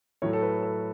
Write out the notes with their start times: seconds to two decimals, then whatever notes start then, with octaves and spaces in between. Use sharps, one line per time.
0.22 A2 F#3 A3 C#5
0.33 A4
0.42 B4
0.63 A4